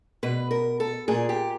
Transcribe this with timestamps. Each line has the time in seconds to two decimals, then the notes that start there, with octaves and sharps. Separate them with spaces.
0.23 B2 B4
0.51 A#4
0.80 A4
1.08 A#2 G#4
1.29 G4